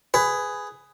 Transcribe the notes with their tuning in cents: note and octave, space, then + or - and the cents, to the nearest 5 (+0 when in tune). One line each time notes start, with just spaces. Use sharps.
G#4 +0 B4 +15